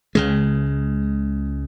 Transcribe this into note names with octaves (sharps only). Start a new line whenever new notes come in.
C#2 C#3 G#3